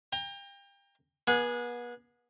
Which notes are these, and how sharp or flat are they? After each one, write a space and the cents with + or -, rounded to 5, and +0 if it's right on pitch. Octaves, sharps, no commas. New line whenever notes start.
G5 +30 A#5 +0
B3 -35 G#4 +0 F#5 -30